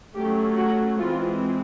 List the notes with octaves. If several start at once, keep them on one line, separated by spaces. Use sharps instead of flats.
F#3 A3 C#4 G4
F#4
E3 G#3 C4 F4